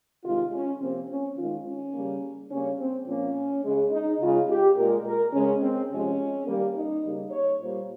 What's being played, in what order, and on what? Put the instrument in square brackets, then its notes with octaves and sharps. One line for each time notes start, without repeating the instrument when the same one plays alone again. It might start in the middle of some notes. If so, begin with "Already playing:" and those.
[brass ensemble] C3 D#3 G#3 F4
C#4
C3 F3 A#3 C4
C#4
D#3 G#3 F4
C#4
C#3 G3 A#3
C#3 G3 A#3 C#4
C4
A#2 F3 A#3 C#4
C#3 G#3
D#4
C#3 G#3 F4
G4
A#2 G#3 A#4
A#4
C#3 G#3 C#4
C4
C3 F3 G#3 C#4
D#3 G3 A#3
D#4
C#3 G3 A#3
C#5
A#2 G3 A#3 C5